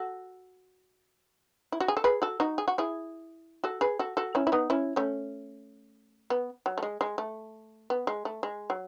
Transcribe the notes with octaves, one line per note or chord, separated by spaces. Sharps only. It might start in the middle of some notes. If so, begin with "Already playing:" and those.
Already playing: F#4 A4
E4
F#4
G#4
A4
G#4 B4
F#4 A4
D#4 F#4
G#4
F#4
E4 G#4
F#4 A4
G#4 B4
F#4 A4
F#4 A4
C#4 E4
E4
B3 D#4
C#4 E4
A3 C#4
B3
F#3
A3
G#3
G#3
A3
B3
G#3
A3
G#3
F#3